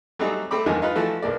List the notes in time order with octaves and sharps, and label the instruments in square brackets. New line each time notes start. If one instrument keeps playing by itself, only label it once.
[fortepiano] F#3 G3 A3 C4 D#4 G#4
A3 C4 B5 D6
E2 D#3 F3 G#3 D#4 G#5
D#4 F4 B4
E3 F3 A3 F#4
B1 A#3 D5